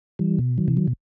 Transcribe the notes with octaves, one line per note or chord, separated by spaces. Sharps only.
E3 G3
B2
D#3 F#3
C3 E3
D#3 F#3
B2